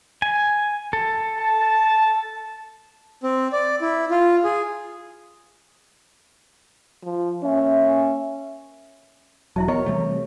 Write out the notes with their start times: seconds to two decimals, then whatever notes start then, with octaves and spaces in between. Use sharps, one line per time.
0.22 G#5
0.93 A4
1.39 A5
3.23 C4
3.53 D5
3.81 E4
4.11 F4
4.44 G#4
7.04 F3
7.43 A#3 C#4 E5
9.56 E1 F#3 E4 E5 A5
9.68 B3 A#4 C#5 D#5
9.86 C3 E3 G3 A3